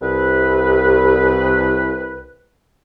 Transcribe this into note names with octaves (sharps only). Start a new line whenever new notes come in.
C2 B4